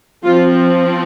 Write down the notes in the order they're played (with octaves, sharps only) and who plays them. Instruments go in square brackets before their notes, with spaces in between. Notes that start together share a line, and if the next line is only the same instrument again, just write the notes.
[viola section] F3 C4 F4